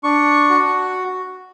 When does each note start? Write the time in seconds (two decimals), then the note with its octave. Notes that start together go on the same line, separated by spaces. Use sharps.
0.03 D4 C#6
0.50 F#4